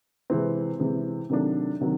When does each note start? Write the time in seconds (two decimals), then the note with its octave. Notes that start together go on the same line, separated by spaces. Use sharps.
0.30 C3 E3 G#3 C4
0.79 C3 E3 G#3 C4
1.30 C3 D#3 F#3 A3 D4
1.81 C3 D#3 F#3